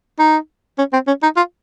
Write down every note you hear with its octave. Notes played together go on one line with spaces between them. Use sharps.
D#4
C#4
C4
C#4
D#4
F4